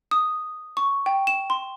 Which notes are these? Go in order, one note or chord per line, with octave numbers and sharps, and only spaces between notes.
D#6
C#6
G5
E7
C6